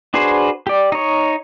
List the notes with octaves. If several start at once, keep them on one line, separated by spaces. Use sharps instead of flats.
D4 F#4 G#4 B4 C5
G4 D5
D#4 C#5